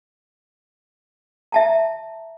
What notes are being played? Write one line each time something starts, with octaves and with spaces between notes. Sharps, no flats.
E5 A5 A#5